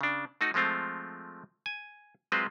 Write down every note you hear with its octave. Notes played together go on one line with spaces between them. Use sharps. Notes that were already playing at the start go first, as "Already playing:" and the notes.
C#3 D4
A3 D#4 F#4
F3 G#3 A3 C4 F4
G#5
F#3 G#3 C4 F4 B4 C5